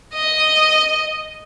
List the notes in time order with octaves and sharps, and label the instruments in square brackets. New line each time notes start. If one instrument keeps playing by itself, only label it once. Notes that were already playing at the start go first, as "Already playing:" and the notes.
[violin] D#5